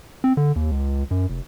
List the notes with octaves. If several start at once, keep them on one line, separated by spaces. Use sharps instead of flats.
C4
D3
D#2
C#2
F#2
F1